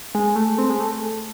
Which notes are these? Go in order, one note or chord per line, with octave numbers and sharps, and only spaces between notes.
G#3
A3
C4
G#3
A3